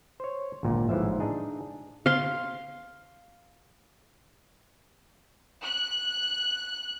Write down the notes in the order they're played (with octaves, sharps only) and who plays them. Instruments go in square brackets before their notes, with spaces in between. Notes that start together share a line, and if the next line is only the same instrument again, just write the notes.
[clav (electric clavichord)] C5 C#5
G#1 D2 A#2
A1 G#2 E3 F3 E5
D4 D#4 G#4
[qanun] F5 C6
[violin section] F#6